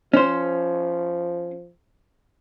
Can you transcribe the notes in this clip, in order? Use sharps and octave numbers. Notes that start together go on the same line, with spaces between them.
F3 C#4 C5